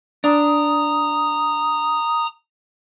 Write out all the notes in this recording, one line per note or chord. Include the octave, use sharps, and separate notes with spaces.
D4 A#5 D#6